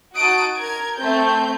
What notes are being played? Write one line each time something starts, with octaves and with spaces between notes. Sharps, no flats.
D#4 F#4 A5 D#6 F#6 D7
A#4 G#6
A3 C4 G6